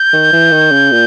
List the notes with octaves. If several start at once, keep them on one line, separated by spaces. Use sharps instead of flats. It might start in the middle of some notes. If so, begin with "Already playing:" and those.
Already playing: G6
D#3
E3
D#3
C#3
A#2